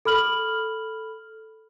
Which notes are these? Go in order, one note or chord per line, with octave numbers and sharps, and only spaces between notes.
A4 B5 F6 F#7